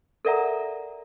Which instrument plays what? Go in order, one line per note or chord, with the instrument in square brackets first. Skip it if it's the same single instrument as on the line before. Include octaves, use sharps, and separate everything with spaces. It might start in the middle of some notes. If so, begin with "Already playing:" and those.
[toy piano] A4 A#4 D5 E5 F#5 A#5